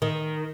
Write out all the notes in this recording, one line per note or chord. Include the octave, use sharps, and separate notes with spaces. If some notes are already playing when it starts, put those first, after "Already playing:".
D#3